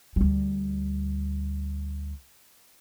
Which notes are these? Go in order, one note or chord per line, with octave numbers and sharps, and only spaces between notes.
D2 G3